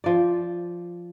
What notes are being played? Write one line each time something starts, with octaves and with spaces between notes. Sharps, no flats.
F3 D5